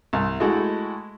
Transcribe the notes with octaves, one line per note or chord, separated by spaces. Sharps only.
C2
G#3 A3 E4 F#4